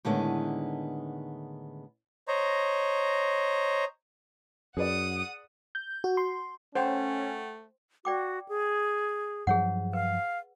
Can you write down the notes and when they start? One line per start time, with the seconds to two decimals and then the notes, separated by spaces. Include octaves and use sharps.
0.05 A2 D3 D#3 G#3 B3
2.28 C5 C#5 D#5 A#5
4.77 F#2 G#4 B4 D5 F#5 D#6
5.75 G6
6.04 F#4
6.17 C6
6.75 A3 C#4 C5 F#5 G5
8.05 F#4 D5 G5 D6
8.49 G#4
9.47 G2 F3 F#3 G#4 C#5 F#5
9.93 B4 F5